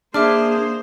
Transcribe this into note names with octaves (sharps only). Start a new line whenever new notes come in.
A#3 D4 G#4 C5 E5 D6 F6